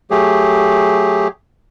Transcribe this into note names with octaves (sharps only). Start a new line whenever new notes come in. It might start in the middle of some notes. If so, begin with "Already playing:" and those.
F#3 A3 G4 G#4